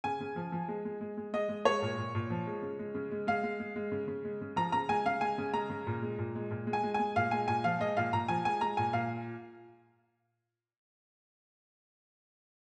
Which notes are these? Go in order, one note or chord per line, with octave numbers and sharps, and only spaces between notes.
C#3 G#5
C#3
F3
F3
G#3
G#3
G#3
G#3
G#3 D#5
G#3
G#3 C#5
A#2
A#2
A#2
F3
G#3
C#3
G#3
C#3
G#3
G#3 F5
G#3
G#3
G#3
C#3
C#3
G#3
C#3
F3 A#5
C#3 A#5
G#3 G#5
C#3 F5
G#3 G#5
C#3
G#3 A#5
C#3
A#2
G#3
A#2
G#3
A#2
G#3
G#5
G#3
G#3 G#5
A#2 F5
G#3 G#5
A#2 G#5
F3 F5
G#3 D#5
A#2 F5
A#2 A#5
F3 G#5
G#3 G#5
G#3 A#5
A#2 G#5
A#2 F5